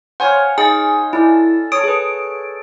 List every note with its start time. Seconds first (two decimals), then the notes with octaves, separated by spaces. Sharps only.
0.20 C5 C#5 F5 F#5 G#5
0.58 D#4 G#4 G#5 A6
1.13 E4 A4 D5
1.72 A4 C#5 D#6 D7
1.84 G#4 B4